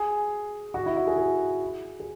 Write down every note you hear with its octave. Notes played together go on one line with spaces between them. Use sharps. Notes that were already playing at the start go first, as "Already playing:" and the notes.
Already playing: G#4
F#4
E4
F#4
G#4
G#4
G#4